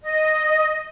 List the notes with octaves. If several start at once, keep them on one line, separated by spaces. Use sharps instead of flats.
D#5